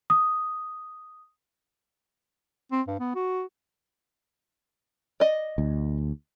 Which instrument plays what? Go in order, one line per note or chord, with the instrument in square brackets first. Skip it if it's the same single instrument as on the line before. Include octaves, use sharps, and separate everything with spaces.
[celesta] D#6
[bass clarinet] C4
G2
B3
F#4
[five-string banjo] D5 D#5
[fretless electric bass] D2